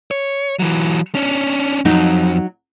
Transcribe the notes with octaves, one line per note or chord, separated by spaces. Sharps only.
C#5
E3 F#3
C#4 D4
F2 F#3 D#4